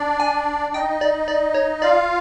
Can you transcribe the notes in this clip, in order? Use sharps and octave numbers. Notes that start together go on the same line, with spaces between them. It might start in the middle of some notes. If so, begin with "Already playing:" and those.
Already playing: D4 D5
G#5
D#4 D#5 G5
D5
D5
C#5
F4 D5 F5